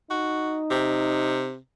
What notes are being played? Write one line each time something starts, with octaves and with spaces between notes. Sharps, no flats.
D#4 F#4
C3